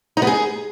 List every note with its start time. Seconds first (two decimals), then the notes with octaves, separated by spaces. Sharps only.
0.17 D#4
0.22 B3
0.27 G#4